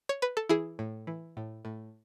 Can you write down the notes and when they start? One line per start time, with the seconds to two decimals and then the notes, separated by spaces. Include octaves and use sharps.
0.09 C#5
0.22 B4
0.37 A4
0.49 E3 E4 G#4
0.79 A2
1.07 E3
1.37 A2
1.65 A2